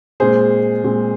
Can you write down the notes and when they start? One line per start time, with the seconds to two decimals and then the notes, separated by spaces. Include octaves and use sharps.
0.20 A#2 G#3 C4 G#4 C5
0.84 A#2 G#3 C4